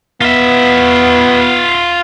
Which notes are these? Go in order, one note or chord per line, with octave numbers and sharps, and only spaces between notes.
B3 F4 E5